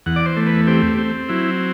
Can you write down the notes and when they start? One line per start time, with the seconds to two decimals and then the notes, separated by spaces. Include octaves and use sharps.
0.06 E2 F#5
0.16 D5
0.26 C5
0.36 A3
0.46 B4
0.67 C4 G4
0.88 G4
0.98 C4
1.29 F#3 E4